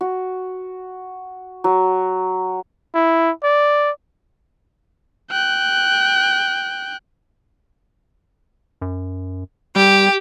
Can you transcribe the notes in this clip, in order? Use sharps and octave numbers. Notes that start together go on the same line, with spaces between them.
F#4
F#3
E4
D5
G5 F#6
F#2
G3 G4